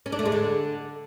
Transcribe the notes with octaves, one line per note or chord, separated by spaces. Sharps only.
C#4
D4
A3
G#3
D3